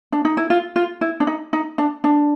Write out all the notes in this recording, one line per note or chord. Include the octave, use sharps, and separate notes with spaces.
D4
D#4
E4
F4
F4
E4
D4
D#4
D#4
D4
D4